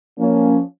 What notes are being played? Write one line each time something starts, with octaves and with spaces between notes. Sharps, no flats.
F3 A#3 C#4